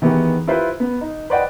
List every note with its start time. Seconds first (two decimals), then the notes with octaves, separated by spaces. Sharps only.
0.02 D#3 E3 B3 G4 G#4
0.47 E4 F4 G4 B4 C5
0.80 B3
1.01 D#4
1.30 B4 C5 D5 D#5 F#5 G5